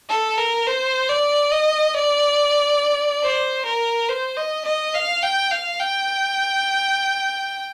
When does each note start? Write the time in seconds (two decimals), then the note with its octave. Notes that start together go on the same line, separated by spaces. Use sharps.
0.09 A4
0.38 A#4
0.66 C5
1.09 D5
1.51 D#5
1.94 D5
3.23 C5
3.65 A#4
4.09 C5
4.37 D#5
4.65 D#5
4.94 F5
5.22 G5
5.51 F5
5.79 G5